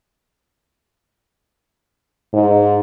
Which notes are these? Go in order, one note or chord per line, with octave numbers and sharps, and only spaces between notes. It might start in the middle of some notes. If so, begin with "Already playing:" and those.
G#2